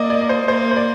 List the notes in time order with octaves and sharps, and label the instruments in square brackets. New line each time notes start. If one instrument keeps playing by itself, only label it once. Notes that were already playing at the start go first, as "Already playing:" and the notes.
Already playing: [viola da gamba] A#3 [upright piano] D5 D#5
[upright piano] D5
D5
C5
[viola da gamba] A#3 [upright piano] C5
[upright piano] C5
D5